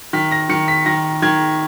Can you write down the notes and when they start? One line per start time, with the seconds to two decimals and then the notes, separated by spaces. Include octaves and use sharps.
0.13 D#3 B6
0.32 A#6
0.49 D#3 C#7
0.68 B6
0.86 D#3 A#6
1.22 D#3 G#6